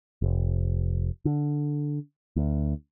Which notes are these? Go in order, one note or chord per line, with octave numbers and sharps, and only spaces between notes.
F1
D3
D2